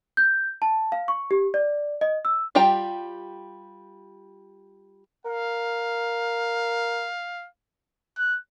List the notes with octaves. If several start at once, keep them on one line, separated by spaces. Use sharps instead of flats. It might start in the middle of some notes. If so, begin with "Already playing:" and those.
G6
A5
F5
C#6
G4
D5
D#5
E6
G3 F4 G4 G5 A#5
A#4 F5
F#6